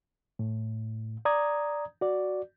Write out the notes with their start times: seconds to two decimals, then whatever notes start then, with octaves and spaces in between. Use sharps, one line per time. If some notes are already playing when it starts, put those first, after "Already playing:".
0.39 A2
1.25 D5 A#5 D#6 G#6
2.01 F#4 D5